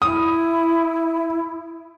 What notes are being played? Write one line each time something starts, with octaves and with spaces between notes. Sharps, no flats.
E4 D#6